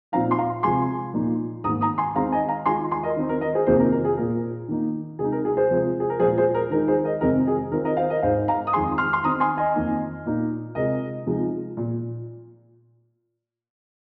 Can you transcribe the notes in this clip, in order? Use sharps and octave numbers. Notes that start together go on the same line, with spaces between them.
A#2 F3 C4 D#4 F5 A#5
C6
F5 A#5
C3 F3 G#3 G#5 C6
A#2 F3 A#3 D#4
G#2 D#3 A#3 A#5 D#6
A#5 D#6
G#5 C6
D#3 G#3 C4 D#4 F5 A#5
D#5 G#5
F5 A#5
D#3 G#3 F4 G#5 C6
G#5 C6
A#4 D#5
D#3 C4 D#4
A#4
A#4 D#5
G#4 C5
F2 C3 D#3 A#3 F4 G#4 C5
A#4
A#4
G#4
A#2 A#3 F4 A#4
D#3 A#3 D#4
C3 G#3 D#4 G#4
A#4
G#4
G#4 C5
C3 F3 G#3 F4
G#4
A#4
A#2 F3 G#3 F4 G#4 C5
G#4 C5
A#4
D#3 G#3 D#4 A#4
G#4 C5
A#4 D#5
F2 C3 D#3 G#3 C4 A#4 D#5
G#4
D#3 C4 F4 A#4
A#4 D#5
C5 F5
A#4 D#5
G#2 G#3 D#4 C5 F5
F5 A#5
D#6
F2 D#3 G#3 G#5 C6
C6 F6
C6
D#3 C4 D#4 A#5 D#6
G#5 C6
D#5 G#5
F2 D#3 A#3 D#4
A#2 A#3 D#4
C3 G#3 F4 A#4 D#5
C3 F3 G#3 D#4
A#2